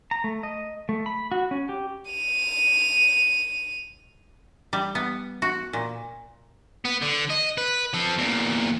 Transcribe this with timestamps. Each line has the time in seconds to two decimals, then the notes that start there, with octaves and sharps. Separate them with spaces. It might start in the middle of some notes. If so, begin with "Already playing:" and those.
0.11 A#5
0.24 A3
0.43 D#5
0.89 A3
1.06 B5
1.32 F#4
1.51 C#4
1.69 G4
2.11 D#7 F7
4.73 G3
4.95 B3
5.42 F#4
5.73 A#2
6.85 B3
7.02 D3
7.30 D#5
7.58 B4
7.94 F3 A4
8.18 E2 A#2